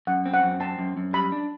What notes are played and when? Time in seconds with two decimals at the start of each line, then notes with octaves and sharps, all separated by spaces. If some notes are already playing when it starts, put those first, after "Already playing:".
0.07 F#2 F#5
0.26 C4
0.34 F#5
0.43 F#2
0.60 C4 A5
0.79 F#2
0.97 F#2
1.13 G3 B5
1.32 D4